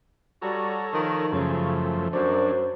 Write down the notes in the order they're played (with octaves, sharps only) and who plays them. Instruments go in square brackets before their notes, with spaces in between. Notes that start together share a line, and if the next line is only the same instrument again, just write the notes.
[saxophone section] G3 F#4 [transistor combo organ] A4 C#5 A#5
[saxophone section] D#3 F3
[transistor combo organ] F#2 F3 A3 [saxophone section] C#3
[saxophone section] F#2 [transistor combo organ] F#3 D4 [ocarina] C5